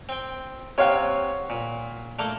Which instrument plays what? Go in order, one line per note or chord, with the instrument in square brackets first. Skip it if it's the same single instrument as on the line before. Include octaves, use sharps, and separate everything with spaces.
[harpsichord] C4 G5
[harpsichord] C3 C4 [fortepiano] C#5 F5 F#5
[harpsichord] A#2
D3 A3 A#3